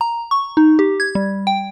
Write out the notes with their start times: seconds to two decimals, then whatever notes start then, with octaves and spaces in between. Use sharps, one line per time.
0.01 A#5
0.31 C#6
0.57 D#4
0.79 G4
1.00 G#6
1.15 G3
1.47 G5